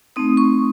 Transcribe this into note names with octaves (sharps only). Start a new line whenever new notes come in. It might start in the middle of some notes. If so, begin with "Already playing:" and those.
A3 C4 D#4 D#6
C#6